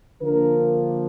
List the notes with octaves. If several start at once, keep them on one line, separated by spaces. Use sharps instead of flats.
D3 F3 A#3 D4 A#4